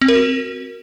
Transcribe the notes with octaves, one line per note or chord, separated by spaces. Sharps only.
C4
A#4
F#4